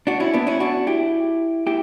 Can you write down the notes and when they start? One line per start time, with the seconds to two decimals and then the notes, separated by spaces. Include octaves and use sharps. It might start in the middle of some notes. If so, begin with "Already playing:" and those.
0.07 D4 F#4
0.20 C#4 E4
0.33 B3 D4
0.47 C#4 E4
0.60 D4 F#4
0.87 E4 G4
1.67 E4 G4